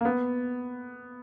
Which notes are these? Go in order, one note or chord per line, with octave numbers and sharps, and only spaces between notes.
A#3
B3